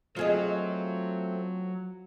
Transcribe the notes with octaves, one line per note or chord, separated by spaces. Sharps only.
F#3 A3 C4 F4 G#4 D#5